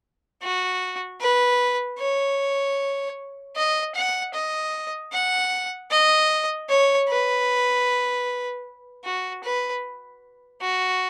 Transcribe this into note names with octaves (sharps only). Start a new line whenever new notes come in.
F#4
B4
C#5
D#5
F#5
D#5
F#5
D#5
C#5
B4
F#4
B4
F#4